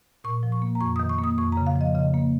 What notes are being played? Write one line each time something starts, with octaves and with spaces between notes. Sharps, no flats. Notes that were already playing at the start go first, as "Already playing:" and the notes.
A#2 C#6
F3
C#6
A#3
A#5
F2 C#6
D#6
D#3
C#6
A#3 D#6
F2 C#6
A#5
C#3
F5
F3
D#5
C#3 D#5
A#3